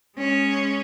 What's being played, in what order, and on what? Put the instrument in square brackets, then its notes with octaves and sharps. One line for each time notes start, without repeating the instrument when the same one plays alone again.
[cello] G#3 C#4